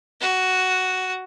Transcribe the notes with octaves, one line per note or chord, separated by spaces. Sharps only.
F#4